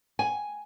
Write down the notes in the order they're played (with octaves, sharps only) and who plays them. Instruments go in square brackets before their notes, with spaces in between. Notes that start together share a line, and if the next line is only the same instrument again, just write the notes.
[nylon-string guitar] G#5